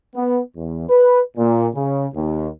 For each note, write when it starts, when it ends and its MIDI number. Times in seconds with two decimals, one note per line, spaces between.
0.15 0.40 59
0.57 0.89 40
0.90 1.20 71
1.37 1.67 46
1.74 2.06 49
2.14 2.49 39